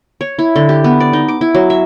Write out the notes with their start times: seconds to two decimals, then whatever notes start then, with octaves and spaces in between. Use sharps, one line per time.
0.21 C#5
0.39 E4
0.56 D3
0.69 G4
0.84 B3
1.00 D5
1.13 D#4
1.28 D6
1.41 E4
1.54 F#3
1.70 E5